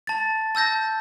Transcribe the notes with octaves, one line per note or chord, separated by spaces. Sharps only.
A5 A6
A5 E6 G6 A#6